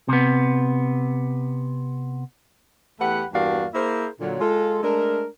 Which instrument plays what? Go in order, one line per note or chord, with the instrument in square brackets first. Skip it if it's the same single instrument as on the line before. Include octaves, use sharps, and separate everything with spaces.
[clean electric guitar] C3 B3
[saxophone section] E2 A3 G4 B4 F#5
E2 G2 A#3 F#4 D5 F5
A#3 E4 G#4 A#4 C5
A#2 D3 F#3
G#3 F4 A4
G#3 A3 D4 A#4